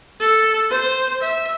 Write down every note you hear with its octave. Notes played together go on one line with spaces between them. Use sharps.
A4
C5
E5